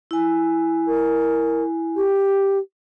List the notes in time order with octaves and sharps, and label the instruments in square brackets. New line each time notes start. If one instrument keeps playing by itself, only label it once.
[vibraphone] E4 G#5
[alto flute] A#4
G4